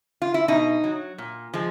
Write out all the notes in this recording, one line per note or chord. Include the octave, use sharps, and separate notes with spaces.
F4
E4
B2 D#4
F#3
A#2
F3 G#3